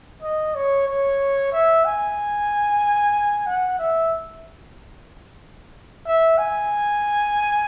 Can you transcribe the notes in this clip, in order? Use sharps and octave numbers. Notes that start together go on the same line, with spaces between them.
D#5
C#5
C#5
E5
G#5
F#5
E5
E5
G#5